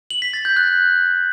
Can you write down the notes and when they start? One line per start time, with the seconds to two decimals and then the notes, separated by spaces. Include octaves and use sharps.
0.10 F#7
0.22 B6
0.34 A6
0.45 G6
0.57 F#6